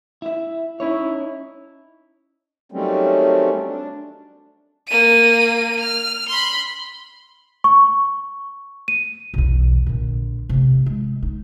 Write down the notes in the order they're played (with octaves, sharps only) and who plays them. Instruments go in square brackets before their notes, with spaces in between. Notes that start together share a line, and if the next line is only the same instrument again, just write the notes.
[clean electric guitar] E4 E5
[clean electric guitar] C#4 D#4 C#5 [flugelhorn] E4
[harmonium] D#3 F#3 G3 A3 C4 C#4
D4
[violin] A#3 D#7
F6
B5 C6
[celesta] C#6
D#7
[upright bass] B1 E2
A#1 D3
C3 A3
G#3
D#4